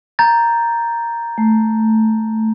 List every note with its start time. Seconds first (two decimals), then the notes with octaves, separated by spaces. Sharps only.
0.19 A#5 G6 A6
1.38 A3